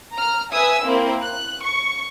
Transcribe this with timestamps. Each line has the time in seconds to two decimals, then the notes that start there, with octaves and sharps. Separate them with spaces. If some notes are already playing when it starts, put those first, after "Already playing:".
0.15 A#5 F6
0.53 B4 E5 G#5 D#6 E6
0.85 A#3 C4 E4 A#4
1.23 F#6
1.63 C#6